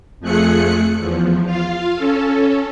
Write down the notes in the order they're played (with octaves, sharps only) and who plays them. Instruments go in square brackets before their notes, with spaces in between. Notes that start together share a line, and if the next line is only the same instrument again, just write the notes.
[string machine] F2 F3 A3 G#4 F#6 C#7
E2 F3
F4 F5
C#4 A4